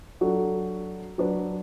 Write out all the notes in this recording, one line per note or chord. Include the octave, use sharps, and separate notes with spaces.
F#3 D4 F#4 A4
F#3 D4 B4